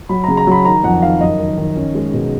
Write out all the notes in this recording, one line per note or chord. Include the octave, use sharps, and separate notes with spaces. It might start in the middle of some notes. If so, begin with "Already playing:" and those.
F#3 B5
C#3 A#5
A#5
F#3 B5
D#3 A#5
F2 F#5
D#3 F5
F#2 D#5
D#3
D#3
C#4
G#3
B2